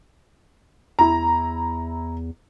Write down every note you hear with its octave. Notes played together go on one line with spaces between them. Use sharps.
E2 E4 A#5